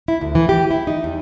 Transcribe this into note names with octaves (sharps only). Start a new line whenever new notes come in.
E4
D2
E3
G4
E4
D#4
E2